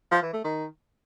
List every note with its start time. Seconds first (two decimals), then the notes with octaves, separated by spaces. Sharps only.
0.11 F3
0.22 E3
0.33 A3
0.44 D#3